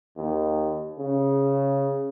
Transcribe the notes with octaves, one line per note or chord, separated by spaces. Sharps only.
D#2
C#3